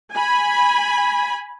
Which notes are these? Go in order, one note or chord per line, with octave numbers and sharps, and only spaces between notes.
G#5 B5